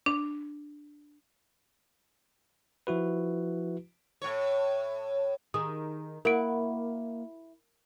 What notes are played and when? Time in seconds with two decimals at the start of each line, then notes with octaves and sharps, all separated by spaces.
0.06 D4
2.87 F3 E4 F#4 B4
4.22 A2 C#5
5.54 D#3 G#4 D#6
6.25 A#3 E4 F#4 A#4 D7